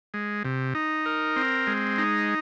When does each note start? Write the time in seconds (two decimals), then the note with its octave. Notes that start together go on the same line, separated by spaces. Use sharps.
0.14 G#3
0.45 C3
0.75 D#4
1.06 A#4
1.36 C4
1.67 G#3
1.98 D#4